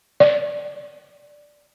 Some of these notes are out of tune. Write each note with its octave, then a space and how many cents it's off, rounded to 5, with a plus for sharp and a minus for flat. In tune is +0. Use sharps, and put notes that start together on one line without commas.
D5 +0